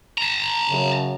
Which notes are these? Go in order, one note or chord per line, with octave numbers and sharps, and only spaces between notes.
A5 A#5
F#2 C#3